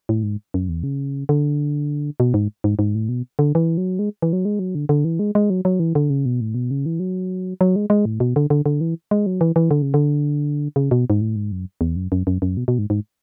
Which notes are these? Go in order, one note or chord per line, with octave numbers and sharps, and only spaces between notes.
A2
G#2
F#2
E2
C#3
D3
B2
G#2
G#2
G#2
A2
B2
D3
E3
F#3
G#3
E3
F#3
G#3
F#3
D3
D3
E3
G#3
G#3
F#3
F#3
E3
D3
C#3
B2
A2
B2
C#3
E3
F#3
F#3
G#3
G#3
A2
B2
D3
D3
D3
E3
G#3
F#3
E3
E3
D3
C#3
D3
C#3
B2
G#2
A2
G#2
F#2
E2
F#2
F#2
F#2
F#2
B2
B2
G#2
G#2